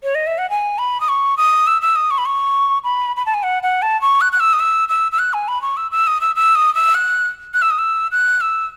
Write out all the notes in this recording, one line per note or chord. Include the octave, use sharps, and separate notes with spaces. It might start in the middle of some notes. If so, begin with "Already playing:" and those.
C#5
D#5
E5
F#5
G#5
B5
D#6
C#6
D#6
E6
E6
D#6
C#6
B5
C#6
B5
B5
A5
G#5
F#5
F#5
A5
C#6
F#6
F#6
E6
D#6
E6
E6
E6
F#6
G#5
B5
C#6
E6
E6
D#6
E6
E6
D#6
E6
F#6
F#6
E6
D#6
E6
F#6
E6